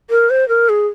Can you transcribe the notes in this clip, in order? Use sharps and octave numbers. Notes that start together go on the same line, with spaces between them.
A#4
C5
A#4
G#4